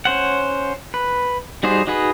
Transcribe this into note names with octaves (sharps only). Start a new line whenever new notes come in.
C#4 C5 F#5
B4
G3 D#4 F#4 G#4 C5
D#4 F#4 G#4 B4